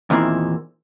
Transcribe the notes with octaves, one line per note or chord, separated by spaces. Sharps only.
E2 A#2 D#3 C4 E4